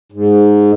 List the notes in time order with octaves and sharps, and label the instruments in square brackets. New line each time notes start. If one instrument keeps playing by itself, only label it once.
[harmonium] G#2